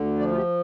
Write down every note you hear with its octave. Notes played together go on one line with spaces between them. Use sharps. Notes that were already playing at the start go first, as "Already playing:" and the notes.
Already playing: D2 D3
F3 D5
F4
G4